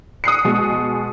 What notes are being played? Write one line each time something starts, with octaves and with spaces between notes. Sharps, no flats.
D#6 F#6 C7 C#7
B2 G#3